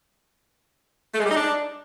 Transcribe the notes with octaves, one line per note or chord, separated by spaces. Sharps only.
A3
G#3
G3
D#4
D4